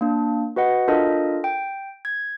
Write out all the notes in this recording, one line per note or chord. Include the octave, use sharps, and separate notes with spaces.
A#3 D4
F#4 B4 D#5 F#5
D4 F4 A4 A#4 D#5
G5
G#6